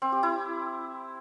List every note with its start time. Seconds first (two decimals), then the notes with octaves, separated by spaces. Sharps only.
0.02 C4
0.12 G4
0.23 E4